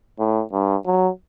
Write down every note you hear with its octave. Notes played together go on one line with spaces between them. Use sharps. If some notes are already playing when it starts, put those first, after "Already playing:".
A2
G2
F#3